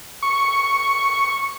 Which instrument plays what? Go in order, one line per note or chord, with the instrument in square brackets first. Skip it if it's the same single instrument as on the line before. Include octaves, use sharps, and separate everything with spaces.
[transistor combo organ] C#6